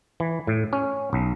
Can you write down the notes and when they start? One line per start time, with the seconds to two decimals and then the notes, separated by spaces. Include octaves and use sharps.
0.20 E3
0.47 A2
0.73 C#4
1.13 B1